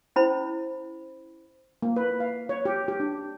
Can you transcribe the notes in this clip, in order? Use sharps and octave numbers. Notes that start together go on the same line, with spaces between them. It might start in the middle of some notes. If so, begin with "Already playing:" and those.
C#4 E4 C5 B5
A#3
B4
F5
C#5
G4
G4
D4